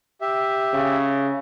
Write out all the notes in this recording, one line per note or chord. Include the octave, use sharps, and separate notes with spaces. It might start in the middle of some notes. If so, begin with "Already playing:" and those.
G4 E5
C#3